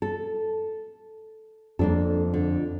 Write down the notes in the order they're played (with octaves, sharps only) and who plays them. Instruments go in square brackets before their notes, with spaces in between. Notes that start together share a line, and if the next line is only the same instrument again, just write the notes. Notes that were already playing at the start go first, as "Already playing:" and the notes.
[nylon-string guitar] A4
[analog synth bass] F2 [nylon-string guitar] A#3 D4 A4
[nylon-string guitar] D3